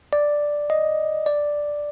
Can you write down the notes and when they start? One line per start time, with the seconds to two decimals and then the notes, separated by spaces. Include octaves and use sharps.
0.13 D5
0.70 D#5
1.26 D5